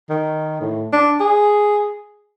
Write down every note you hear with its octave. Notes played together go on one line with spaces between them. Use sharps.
D#3
A2
D4
G#4